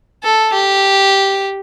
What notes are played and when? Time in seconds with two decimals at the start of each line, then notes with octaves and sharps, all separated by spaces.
0.23 A4
0.53 G4